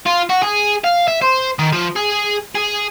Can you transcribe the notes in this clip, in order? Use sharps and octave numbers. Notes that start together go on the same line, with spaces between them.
F4
F#4
G#4
F5
E5
C5
D#3
F3
G#4
G#4